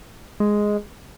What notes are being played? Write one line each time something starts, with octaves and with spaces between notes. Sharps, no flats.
G#3